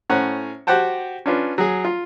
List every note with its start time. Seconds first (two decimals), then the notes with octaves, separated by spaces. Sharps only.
0.10 A2 C#4 C5 F#5 A#5
0.67 F#4 G4 C5 F#5 G5 A5
1.26 C#4 D4 F4 B4
1.58 F#3 G#4
1.85 F4